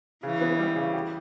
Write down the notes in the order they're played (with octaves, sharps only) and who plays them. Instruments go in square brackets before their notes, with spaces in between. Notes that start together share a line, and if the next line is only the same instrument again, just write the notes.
[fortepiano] C#3 [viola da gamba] E3
[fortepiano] B3
G3
C#3
G4